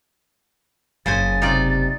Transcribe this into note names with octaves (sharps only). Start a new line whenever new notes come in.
F#1 C#3 C5 G#5 A6
C3 D#4 F4 D5